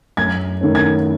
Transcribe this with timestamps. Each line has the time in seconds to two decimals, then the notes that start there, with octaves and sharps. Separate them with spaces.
0.17 F#2 G#6
0.61 D#3 A3 C#4
0.75 G#6